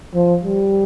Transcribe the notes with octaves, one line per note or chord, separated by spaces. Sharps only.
F3
G3